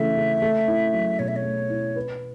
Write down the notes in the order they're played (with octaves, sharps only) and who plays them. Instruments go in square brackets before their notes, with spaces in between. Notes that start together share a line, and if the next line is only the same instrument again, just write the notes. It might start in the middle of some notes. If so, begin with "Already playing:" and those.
Already playing: [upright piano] C#3 E3 A3 [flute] E5
[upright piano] C#3
A3
E4
F#3
[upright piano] B2 [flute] C#5
[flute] E5
C#5
[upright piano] A3
E4
B4